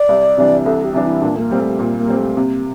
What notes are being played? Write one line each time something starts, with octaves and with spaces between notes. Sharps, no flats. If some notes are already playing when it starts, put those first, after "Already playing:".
Already playing: D5
C2
C3 E3 G3 D4
C2 A4
G4
C3 E3 G3 D4
E4
A#2 D4
A3
A#3
G3 C4
A3
A#2 A#3
A#3
G3 C4
A3
C3 A#3